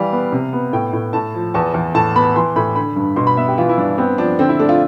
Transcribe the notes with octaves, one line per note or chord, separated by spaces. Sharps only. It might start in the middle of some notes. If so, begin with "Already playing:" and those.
Already playing: E3 G3 F5
B3
C3
B3
A2 G5
A2
A2 A5
F3
E2 A5
E2
A2 A5
B3 B5
E3 C6
A2 B5
D3 B5
G2
B2 C6
B5
B3 E5
G4
E3 F4
E4
G2 D4
B3 C4
F3 D4
D3 C4
E4
A3 D4
F4